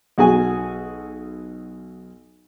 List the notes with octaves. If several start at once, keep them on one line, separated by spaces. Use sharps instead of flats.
B1 F#4 G#4 G#5